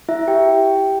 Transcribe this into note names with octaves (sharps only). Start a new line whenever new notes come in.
E4 E5
G4 G5